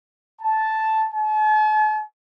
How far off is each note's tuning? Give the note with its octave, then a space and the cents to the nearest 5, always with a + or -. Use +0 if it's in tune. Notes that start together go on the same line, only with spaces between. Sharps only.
A5 -5
A5 -45